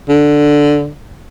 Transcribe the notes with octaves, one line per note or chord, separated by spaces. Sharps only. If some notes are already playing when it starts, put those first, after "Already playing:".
D3